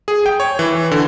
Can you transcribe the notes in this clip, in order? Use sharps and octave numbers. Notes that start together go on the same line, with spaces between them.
G#4
G5
C#5
E3
D3